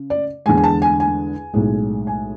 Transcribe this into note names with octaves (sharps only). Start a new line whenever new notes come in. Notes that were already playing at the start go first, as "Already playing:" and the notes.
Already playing: C#3
D5
E2 D3 G#3 G#5
G#5
A5
G#5
G#5
B1 A2 G#3
G#5